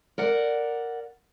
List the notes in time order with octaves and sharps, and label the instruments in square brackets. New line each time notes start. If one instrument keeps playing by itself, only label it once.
[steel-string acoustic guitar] A#4 D5 F#5